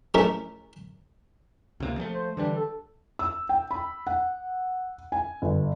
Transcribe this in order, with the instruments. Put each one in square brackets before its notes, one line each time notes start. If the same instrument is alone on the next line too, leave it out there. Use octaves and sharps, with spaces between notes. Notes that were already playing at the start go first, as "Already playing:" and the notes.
[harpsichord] F3 A3 C#4 E4 A#4
[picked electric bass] C#2 C3 A#3
F3 G3 A3
[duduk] C5
[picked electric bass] D3 E3 G3 [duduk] D4
[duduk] A4
[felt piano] E6
G5
B5
F#5
G#5
G1